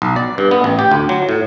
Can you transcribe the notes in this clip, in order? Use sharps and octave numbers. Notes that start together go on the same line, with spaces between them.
B1
D5
G2
B3
A1
G4
D2
F#3
A2